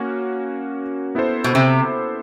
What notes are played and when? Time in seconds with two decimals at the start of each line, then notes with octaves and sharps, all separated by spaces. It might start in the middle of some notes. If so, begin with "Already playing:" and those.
Already playing: A#3 C#4 F#4
1.15 B3 E4 A4 C5
1.44 B2
1.55 C3